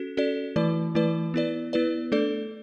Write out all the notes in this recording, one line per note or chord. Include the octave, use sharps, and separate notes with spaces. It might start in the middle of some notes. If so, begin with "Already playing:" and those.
Already playing: C#4 F#4 A4
C#4 F#4 A4 D5
E3 A3 E4 B4 D5
E3 A3 E4 B4 D5
B3 E4 B4 D5
B3 E4 B4 D5
A3 D4 A4 D5